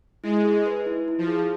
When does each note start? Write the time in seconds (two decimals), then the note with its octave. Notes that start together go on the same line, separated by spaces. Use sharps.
0.23 G#3 E4
0.44 G#4
0.66 B4
0.86 E4
1.08 E4
1.18 F3
1.28 G#4